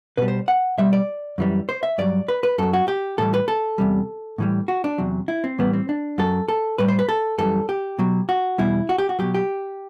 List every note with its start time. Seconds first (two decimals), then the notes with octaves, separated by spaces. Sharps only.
0.17 B2 G3 B4
0.28 C5
0.48 F#5
0.78 B2 G3 E5
0.93 D5
1.38 F#2 E3 G3
1.69 C5
1.83 E5
1.98 G2 F#3 D5
2.28 B4
2.43 B4
2.58 F#2 F#3 A4
2.73 F#4
2.88 G4
3.18 A2 E3 G3 A4
3.34 B4
3.48 A4
3.78 E2 C3 G3
4.38 A2 E3 G3
4.68 F#4
4.84 D4
4.98 E2 C3 F#3
5.28 E4
5.44 C4
5.58 A2 E3 G3 B3
5.73 C4
5.89 D4
6.18 F#2 F#3 A4
6.48 A4
6.78 A2 G3 B4
6.88 C5
6.99 B4
7.09 A4
7.38 F#2 E3 G3 A4
7.69 G4
7.99 B2 F#3
8.29 F#4
8.58 E2 B2 G3 E4
8.89 F#4
8.98 G4
9.09 F#4
9.19 B2 F#3 G4
9.34 G4